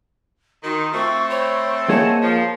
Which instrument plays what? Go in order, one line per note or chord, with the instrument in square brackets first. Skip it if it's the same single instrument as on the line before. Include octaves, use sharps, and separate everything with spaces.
[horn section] D#3 [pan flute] F#4 [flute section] C6
[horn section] A3 C4 [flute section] F4 [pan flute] C#6
[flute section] C5 B5 C#6 [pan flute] C#5
[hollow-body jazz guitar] A#3 G#4 C#5 [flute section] D#5 F#5 G#5 [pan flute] A5
[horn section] F3 [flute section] A#4